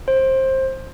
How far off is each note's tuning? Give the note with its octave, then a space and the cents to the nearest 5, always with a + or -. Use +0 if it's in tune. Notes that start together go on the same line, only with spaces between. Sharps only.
C5 +20